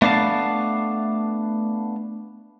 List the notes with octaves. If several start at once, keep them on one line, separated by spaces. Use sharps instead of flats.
A3 B3 D4 F5 A5